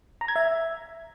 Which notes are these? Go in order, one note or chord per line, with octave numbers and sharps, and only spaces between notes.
A#5
G#6
E5